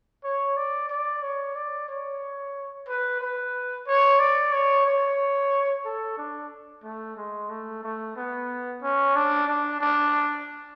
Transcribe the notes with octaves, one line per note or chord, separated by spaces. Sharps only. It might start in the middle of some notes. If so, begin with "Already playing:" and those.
C#5
D5
D5
C#5
D5
C#5
B4
B4
C#5
D5
C#5
C#5
A4
D4
A3
G#3
A3
A3
B3
C#4
D4
D4
D4